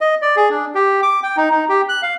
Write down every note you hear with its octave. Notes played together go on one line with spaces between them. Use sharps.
D#5
D5
G#4
D4
G4
D6
G5
D#4
D#4
G4
F#6
F5